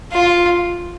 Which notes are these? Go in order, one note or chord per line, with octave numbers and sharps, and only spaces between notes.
F4